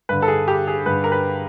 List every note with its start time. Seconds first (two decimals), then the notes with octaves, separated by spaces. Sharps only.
0.09 G2 D3 B4
0.22 A4
0.28 G#4
0.48 G4
0.67 G#4
0.86 G2 D3 B4
1.04 A#4
1.12 B4